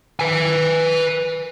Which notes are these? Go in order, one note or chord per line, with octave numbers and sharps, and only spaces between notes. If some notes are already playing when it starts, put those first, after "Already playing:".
B4 G#5